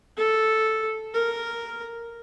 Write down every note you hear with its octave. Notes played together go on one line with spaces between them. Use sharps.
A4
A#4